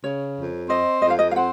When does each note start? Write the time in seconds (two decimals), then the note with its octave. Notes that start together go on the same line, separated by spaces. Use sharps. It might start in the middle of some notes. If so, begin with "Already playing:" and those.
0.03 C#3 C#5
0.37 F2
0.70 C4 D#5
1.02 F2 D#5
1.10 F5
1.19 D#5
1.31 F5
1.36 C4 F#5